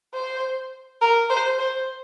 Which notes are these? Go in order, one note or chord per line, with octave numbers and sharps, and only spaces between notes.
C5
A#4
C5
C5